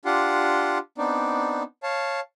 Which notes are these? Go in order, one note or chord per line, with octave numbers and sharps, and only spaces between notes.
D4 F4 G4 F#5 C6
B3 C4 D4 D#4 D5
C#5 F5 A5